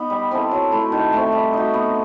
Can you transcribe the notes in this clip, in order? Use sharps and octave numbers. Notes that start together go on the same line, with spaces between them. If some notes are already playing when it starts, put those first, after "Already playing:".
Already playing: B3 D#4
G3
C4 E4 A4
F#3
A3 E4
D#3
A3 C4
G3
D#4 F#4
B3